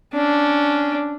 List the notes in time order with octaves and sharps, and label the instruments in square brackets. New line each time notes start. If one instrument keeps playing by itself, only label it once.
[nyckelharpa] C#4 D4